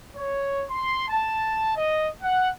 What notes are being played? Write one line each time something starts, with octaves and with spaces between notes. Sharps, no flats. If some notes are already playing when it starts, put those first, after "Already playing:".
C#5
C6
A5
D#5
F#5